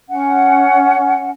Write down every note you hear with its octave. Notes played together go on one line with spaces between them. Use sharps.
C#4 F#5